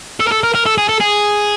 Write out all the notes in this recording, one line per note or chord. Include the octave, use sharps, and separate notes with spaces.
A4
A#4
A4
A#4
A#4
A4
G#4
A4
G#4